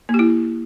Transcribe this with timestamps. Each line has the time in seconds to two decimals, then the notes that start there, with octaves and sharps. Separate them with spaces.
0.09 A#3
0.14 G4
0.19 E4